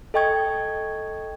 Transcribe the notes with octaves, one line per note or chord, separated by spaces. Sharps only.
A4 D#5 G5 C#6 G#6